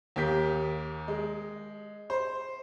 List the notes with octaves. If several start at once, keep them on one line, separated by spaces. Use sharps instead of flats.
D#2 A#3 G4 G6 B6
G#3
C5